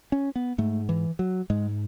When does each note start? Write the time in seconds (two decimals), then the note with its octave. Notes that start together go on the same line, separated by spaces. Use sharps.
0.12 C#4
0.36 B3
0.58 G#2 A3
0.89 E3
1.19 F#3
1.50 G#2 G#3